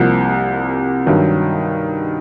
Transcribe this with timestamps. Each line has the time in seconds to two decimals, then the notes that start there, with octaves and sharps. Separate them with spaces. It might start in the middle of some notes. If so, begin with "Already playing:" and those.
Already playing: C2 C3 F3 A#3
1.06 G2 D#3 F#3